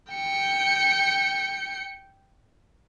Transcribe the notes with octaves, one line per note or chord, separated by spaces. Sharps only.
G5 C#7